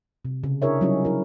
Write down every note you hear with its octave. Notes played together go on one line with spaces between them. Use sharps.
C3
C#3
D4 E4 G#4 A#4 C#5 E5
F#3 G3 C#4 D#4 E4 F#4
E4 A#4